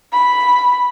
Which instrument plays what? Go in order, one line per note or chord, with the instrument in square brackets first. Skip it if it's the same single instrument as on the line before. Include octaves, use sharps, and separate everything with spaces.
[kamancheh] B5